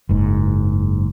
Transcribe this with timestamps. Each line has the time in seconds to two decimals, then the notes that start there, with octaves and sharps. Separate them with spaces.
0.09 F#1 G#2